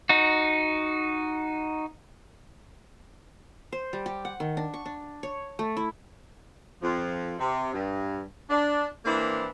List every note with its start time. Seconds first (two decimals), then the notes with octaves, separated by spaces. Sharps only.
0.09 D#4 F#4
3.72 C5
3.93 G3
4.06 G4
4.25 F#5
4.40 D#3
4.57 D4
4.74 C#6
4.85 D4
5.23 C#5
5.59 A3
5.77 E4
6.82 F2 F3
7.39 C3
7.73 G2
8.50 D4
9.05 E3 A#3 C4 D4 E4